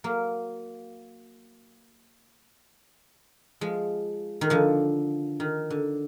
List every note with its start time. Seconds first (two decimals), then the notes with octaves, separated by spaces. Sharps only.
0.04 F#3 A#3
3.61 F3 G#3
4.41 D#3
4.50 D3 F3
5.40 D#3
5.70 D3